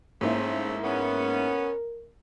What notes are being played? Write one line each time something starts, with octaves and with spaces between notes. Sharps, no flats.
G#2 A3 A#3 C4 C#4 E4
B3 C#4 A#4